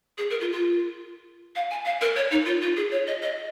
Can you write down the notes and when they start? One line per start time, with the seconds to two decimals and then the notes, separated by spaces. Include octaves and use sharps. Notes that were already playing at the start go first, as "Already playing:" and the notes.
0.18 G#4
0.30 A#4
0.40 F4
0.52 F4
1.55 F5
1.71 G#5
1.85 F5
2.01 A#4
2.16 C#5
2.31 D#4
2.46 F4
2.62 F4
2.76 G#4
2.91 C#5
3.07 D#5
3.22 D#5